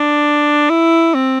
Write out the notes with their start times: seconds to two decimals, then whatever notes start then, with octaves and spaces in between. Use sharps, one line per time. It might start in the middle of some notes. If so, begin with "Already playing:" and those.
Already playing: D4
0.70 E4
1.14 C4